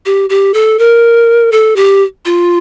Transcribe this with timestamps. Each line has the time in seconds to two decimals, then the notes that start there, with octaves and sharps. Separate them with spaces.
0.06 G4
0.30 G4
0.54 A4
0.79 A#4
1.52 A4
1.76 G4
2.25 F4